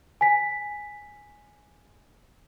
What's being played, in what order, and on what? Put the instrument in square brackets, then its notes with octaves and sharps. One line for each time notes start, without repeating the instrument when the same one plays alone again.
[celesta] G#5 B6